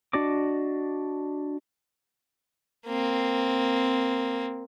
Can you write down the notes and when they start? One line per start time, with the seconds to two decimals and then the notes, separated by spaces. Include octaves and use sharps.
0.13 D4 F#4 D5 D#5 D6
2.86 A#3 C4